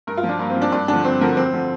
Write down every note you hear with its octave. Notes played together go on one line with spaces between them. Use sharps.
G2 A#4
F4
F3
D4
G2 A#3
C4
F3
D4
G2 D4
D3 F3 D4
G2 C4
D3 F3 A#4
F2 C4
D3 F3